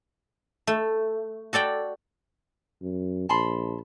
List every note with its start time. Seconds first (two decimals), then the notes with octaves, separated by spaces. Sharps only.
0.67 A3
1.53 F#4 A4 D5 G5
2.82 F#2
3.29 A#1 A5 B5 C6